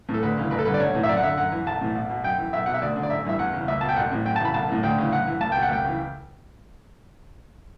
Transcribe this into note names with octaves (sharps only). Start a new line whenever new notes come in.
A2 E3
A4
D2 B4
C#3 E3
A1 B4
A4
G2 D3 B4
D5
B1 C#5
A2 E3
E5
F#2 D5
F#5
D3 E5
F#2 F#5
E3
B1 A5
A2 E3
B1
B2
F#2 G5
E3
B1 E5
B2 F#5
E5
D2 D5
D3
D5
A1 E5
G2 E3 E5
E2 F#5
C#3 E3
C#2 E5
B2 A5
G5
A1 F#5
A2 E3
F#2 G5
A5
C#3 E3 B5
B1 A5
A2 E3
D2 G5
C#3 E3
F#2 F#5
E3
C#2 A5
B2 G5
F#5
C#2 G5
C#3 E3